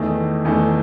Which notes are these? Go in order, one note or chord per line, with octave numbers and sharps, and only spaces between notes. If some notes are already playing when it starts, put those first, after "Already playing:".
Already playing: E2 D#3 A3
E2 D#3 A3